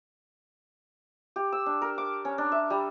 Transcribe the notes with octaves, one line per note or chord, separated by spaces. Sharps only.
G4
E6
D4
A#4
D6
C#4
D4
E5
G3